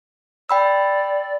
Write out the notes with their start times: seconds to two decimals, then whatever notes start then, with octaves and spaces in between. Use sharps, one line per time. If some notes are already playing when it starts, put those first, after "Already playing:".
0.49 D5 G5 B5 E6